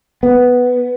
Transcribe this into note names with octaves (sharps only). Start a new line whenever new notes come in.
B3